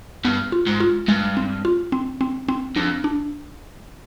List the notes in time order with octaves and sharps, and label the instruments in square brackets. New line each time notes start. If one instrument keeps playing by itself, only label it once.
[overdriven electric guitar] G2 [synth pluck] B3
[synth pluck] F4
[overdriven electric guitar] G#2
[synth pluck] F4
[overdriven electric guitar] G2 [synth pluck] G#3
[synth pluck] C4
F4
C4
C4
C4
[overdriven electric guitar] F2 [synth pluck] D4
[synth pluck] D4